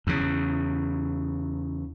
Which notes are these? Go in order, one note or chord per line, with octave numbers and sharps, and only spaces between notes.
E2 C#3